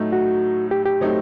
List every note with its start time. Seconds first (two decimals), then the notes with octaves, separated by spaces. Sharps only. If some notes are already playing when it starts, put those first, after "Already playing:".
Already playing: A2 F#3 A3 D#4
0.12 F#4
0.71 G4
0.86 G4
1.00 A2 F#3 A3 C4 D#4